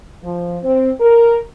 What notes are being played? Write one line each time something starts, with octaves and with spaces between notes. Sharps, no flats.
F3
C4
A#4